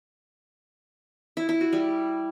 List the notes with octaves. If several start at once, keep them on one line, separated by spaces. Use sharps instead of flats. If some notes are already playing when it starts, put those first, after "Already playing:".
E4
E4
F#4
G3